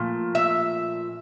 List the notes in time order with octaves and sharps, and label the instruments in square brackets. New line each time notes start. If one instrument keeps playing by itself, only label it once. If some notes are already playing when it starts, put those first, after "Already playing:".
Already playing: [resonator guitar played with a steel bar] A#2 F3 A3
E5